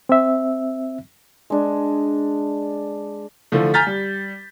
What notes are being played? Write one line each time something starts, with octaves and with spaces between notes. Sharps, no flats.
C4 E5
G#3 D4
D3 E3 F3 A3
G#5 A#5 F6 G6 A6 B6
G3